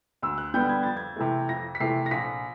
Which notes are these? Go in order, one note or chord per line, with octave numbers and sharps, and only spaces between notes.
D2 E6
F#6
D3 G3 B3 G6
G#6
F2 A6
G#6
C3 E3 A3
F2 A#6
B6
C3 E3 A3 C7
A#6
A#1 B6